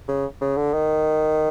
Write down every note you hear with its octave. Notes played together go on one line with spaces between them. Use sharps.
C#3
C#3
D3
D#3